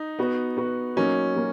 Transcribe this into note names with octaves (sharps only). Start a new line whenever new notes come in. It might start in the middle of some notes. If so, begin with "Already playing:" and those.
Already playing: D#4
B3 F#4 B4
B3 F#4 B4
F#3 A#3 C#4 D#4
F#3 A#3